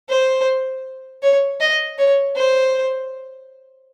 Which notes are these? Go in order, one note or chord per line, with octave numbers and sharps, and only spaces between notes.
C5
C#5
D#5
C#5
C5